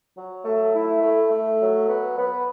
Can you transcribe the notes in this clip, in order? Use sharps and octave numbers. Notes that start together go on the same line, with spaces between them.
F#3
A3
E4
A3
A3
F#3
B3
B3